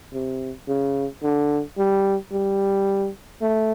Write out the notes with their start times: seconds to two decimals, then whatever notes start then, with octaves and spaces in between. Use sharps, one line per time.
0.14 C3
0.68 C#3
1.23 D3
1.78 G3
2.33 G3
3.42 A3